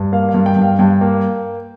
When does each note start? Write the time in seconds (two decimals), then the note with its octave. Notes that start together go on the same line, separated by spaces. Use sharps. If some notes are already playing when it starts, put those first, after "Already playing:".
Already playing: G2
0.12 A#3 F5
0.29 F5
0.34 G2
0.46 G5
0.56 G2
0.62 F5
0.79 G2 G5
1.01 A#3